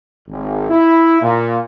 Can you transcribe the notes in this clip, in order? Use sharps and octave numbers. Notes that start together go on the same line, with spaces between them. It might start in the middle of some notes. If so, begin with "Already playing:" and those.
G#1
E4
A#2